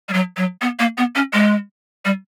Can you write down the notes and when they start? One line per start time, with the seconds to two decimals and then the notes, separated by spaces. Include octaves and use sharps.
0.09 G3
0.13 F#3
0.37 F#3
0.61 B3
0.79 A#3
0.98 B3
1.15 C#4
1.33 G#3
2.05 G3